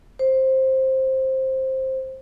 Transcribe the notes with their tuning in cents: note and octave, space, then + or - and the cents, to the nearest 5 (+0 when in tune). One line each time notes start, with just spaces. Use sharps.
C5 +10